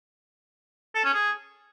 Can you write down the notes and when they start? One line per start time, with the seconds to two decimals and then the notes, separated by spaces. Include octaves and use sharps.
0.95 A4
1.04 C#4
1.14 G#4